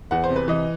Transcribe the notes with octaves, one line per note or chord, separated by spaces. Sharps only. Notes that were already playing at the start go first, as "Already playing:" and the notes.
E2 F#5
C5
C3
B4
E3 D#5